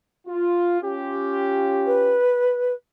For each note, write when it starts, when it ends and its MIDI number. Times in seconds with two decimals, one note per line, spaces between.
0.27 0.79 65
0.82 2.19 61
0.82 2.19 65
0.82 2.19 67
1.86 2.73 71